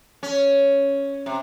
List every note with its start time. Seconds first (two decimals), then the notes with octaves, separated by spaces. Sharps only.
0.23 C#4
1.26 C3